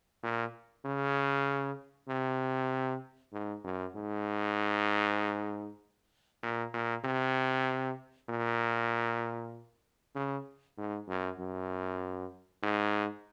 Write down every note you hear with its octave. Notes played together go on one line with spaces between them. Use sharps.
A#2
C#3
C3
G#2
F#2
G#2
A#2
A#2
C3
A#2
C#3
G#2
F#2
F#2
G#2